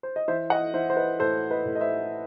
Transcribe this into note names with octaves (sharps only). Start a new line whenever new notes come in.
C5
D#5
E3 C5 E5
D#5 F#5
E3 C5 E5
C5
B4 D#5
A2 A4 C5
B4 D#5
A2
D#5
C5 E5